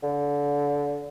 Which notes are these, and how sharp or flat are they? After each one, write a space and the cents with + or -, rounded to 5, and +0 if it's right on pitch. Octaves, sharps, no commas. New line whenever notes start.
D3 -25